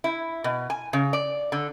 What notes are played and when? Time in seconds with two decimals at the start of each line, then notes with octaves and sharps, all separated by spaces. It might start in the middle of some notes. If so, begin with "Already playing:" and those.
0.04 E4
0.44 B2
0.70 G#5
0.93 C#3
1.13 D5
1.52 D3